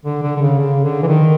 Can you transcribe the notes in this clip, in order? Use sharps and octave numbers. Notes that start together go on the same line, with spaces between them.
D3
D3
D3
C#3
C#3
D3
E3
D#3